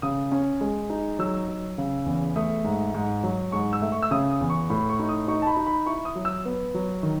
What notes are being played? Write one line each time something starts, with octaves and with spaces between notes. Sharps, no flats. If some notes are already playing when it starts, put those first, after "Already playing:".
C#3 D#6
C#4
G#3
D#4
F#3 E6
F#3
C#3
E2
A3 D#6
G#2
G#2
F#3
G#2 C#6
E6
A3
C#6
E6
C#3 D#6
D#6
E2
C#6
A2 B5
C#6
D#4
D#6
D#4 C#6
A5
B5
D#4
B5
E4 C#6
D#6
F#3
E6
B3
F#3
D#3